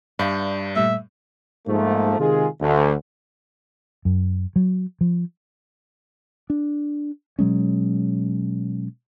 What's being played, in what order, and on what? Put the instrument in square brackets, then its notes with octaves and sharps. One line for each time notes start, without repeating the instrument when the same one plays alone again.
[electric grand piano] G2 [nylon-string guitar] D5 E5 F5 [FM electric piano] B5 G6
[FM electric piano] A#2 G3 A3 [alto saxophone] E5
[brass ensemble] G#2 F3 A3 A#3
C3 D#3 G#3 F4 G#4
D2
[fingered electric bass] F#2
F#3
F3
D4
B2 F#3 G#3 C#4